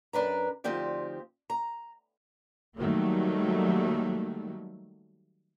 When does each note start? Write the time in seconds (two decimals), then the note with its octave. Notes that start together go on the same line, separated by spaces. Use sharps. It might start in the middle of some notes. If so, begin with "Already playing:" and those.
0.13 F#2 D4 B4 A#5
0.64 D2 F3 C4 D#4 G4 D5
1.50 A#5
2.77 D#3 F#3 G3 A3 A#3